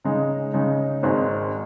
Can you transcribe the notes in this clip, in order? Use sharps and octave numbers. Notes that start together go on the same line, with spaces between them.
C#3 G#3 D#4
C#3 G#3 D#4
G#1 G#2 D#3 G#3 C4